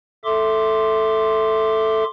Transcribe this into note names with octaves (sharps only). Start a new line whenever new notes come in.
A4 E5 C6 D6